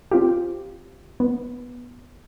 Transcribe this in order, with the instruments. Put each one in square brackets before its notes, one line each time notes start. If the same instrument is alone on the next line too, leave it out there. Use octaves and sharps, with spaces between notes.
[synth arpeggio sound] C4 F4 G4
B3